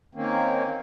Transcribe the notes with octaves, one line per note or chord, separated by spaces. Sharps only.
D#3 A#3 C4 C#4